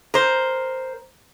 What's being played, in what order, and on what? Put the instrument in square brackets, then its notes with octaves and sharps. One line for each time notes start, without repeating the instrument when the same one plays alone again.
[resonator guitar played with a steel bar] A#4 C5